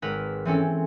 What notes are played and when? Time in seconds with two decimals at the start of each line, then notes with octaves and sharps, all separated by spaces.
0.02 G#1 A#4 B4
0.45 E3 C4 C#4 A4